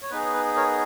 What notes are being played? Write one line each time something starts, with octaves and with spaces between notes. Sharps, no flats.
C#5
B3 D#4 G#4 B4
B4
A#4 C#5